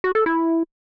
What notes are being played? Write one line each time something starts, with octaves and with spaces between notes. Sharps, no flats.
F#4
A4
E4